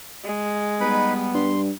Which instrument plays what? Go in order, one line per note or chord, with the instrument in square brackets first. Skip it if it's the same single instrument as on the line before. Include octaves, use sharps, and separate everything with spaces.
[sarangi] G#3
[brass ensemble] G3 B3 [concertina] D#4 B4 B5
[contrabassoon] G2 [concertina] C6